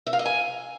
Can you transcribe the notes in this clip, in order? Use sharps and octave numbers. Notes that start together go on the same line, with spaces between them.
E5
F5
D#5
G#5